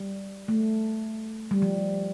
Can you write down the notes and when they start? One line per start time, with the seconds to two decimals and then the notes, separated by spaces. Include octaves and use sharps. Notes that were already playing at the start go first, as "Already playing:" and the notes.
Already playing: G3
0.48 A3
1.51 G3
1.62 F3